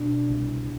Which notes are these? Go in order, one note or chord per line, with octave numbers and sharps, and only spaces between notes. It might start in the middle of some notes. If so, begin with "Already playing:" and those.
Already playing: B2 D4
C2